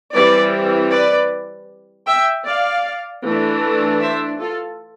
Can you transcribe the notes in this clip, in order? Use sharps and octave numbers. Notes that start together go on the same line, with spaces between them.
E3 G3 C4 B4 D5
B4 D5
E5 G5
D5 F5
E3 A3 D4
C5 E5
F4 A4